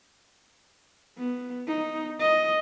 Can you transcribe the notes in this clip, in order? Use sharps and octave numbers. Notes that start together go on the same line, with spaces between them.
B3
D#4
D#5